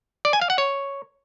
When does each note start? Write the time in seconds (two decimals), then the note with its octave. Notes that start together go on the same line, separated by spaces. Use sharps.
0.25 D5
0.33 G#5
0.42 F5
0.50 F#5
0.58 C#5